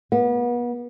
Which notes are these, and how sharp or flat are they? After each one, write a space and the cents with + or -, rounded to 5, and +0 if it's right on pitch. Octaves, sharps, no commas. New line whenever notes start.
B3 -35